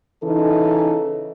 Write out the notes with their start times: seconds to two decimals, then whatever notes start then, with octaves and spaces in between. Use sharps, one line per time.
0.23 C#3 E3 D#4 E4 A4